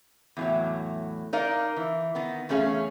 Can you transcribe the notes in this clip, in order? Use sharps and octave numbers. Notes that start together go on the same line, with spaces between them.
E2 A2 F#3
D#4 A#4 D5 D#5 F5
E3
D#3 B3
E2 A3 C#4 G#4 F5